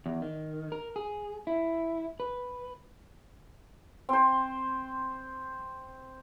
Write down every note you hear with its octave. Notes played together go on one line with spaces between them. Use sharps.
E2
D#3
A#4
G#4
E4
B4
C4 C5